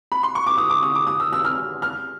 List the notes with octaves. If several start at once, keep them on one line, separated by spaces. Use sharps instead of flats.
B5
C6
C#6
D6
D#6
D6
D#6
D6
D#6
E6
E6
F6
F6